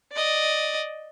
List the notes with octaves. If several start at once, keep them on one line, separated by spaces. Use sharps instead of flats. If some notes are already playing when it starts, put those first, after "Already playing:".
D5 D#5